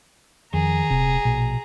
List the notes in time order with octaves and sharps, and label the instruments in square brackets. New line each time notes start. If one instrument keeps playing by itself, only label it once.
[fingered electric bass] F2 [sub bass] D#3 [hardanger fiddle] G#4 A#5
[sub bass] D#1 [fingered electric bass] C3
[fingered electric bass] A#1 [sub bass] B2